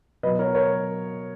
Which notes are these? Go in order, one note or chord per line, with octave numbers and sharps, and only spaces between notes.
B2 F#3 B4 D#5
A#4 C#5
A#4 C#5